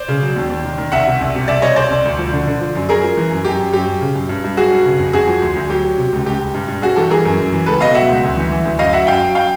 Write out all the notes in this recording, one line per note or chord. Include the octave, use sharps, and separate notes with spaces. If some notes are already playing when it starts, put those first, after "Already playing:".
Already playing: C5 D5
C#3
F#3
D#2
D#2
D#3
D#3
C2 E5 F#5
C3
C2
C3
C2 D5 E5
C3 C#5 D#5
C2 C5 D5
C2
D2
F3
D3
D3
F3
F#2
F#2 G#4 A#4
F3
E3
F#2
F#2 G4
F#2
F#2 G4
F#2
C#3
F#2
G2
G2
F#3 F#4 G#4
G2
C#3
F2
F2 F#4 G#4
F3
D2
D2
F#3 G4
F#3
C3
C#2
C#2 G4
C#2
G2
G2
G2 F#4 G#4
E3 G4 A4
E3 G#4 A#4
F#2
F#2
E3
C#2 A4 B4
B2 D#5 F5
F#3 E5 F#5
C#2
D2
E3
E3
D2
F#2 D#5 F5
F#3 E5 F#5
F#2 F5 G5
F#3
F5 G5